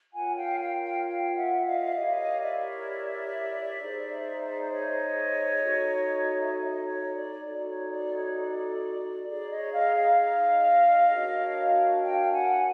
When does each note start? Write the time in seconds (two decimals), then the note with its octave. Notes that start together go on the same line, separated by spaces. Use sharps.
0.13 F4 A#4 C#5 F#5 G#5
0.36 F5 G5
0.59 F5 G5
0.81 F5 G5
1.04 F5 G5
1.35 E5 F#5
1.65 D#5 F5
1.84 E5
1.96 E4 G4 A#4 C#5 D#5 F5
2.41 D5 E5
3.79 D#4 G#4 C5
4.71 C#5 D#5
5.61 D#4 F#4 A4
6.42 E5
6.53 C#5 D#5
6.84 C#5
7.14 D5
7.44 D#4 F#4 A4 D5
7.67 C#5
7.90 D5
8.13 C#5
8.36 D5
9.27 D#4 G#4 C#5 D5
9.50 C#5 D#5
9.73 D#5 F5
9.96 D#5 F5
11.10 D4 F#4 A#4 C#5
12.02 F5 G5
12.32 F#5 G#5